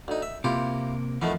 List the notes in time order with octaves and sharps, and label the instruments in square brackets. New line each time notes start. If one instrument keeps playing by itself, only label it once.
[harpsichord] D2 D#4
E5
[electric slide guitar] C3 A#3 [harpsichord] E4 F4 G4
[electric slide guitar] E2 F3 [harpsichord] D#3 A3 B3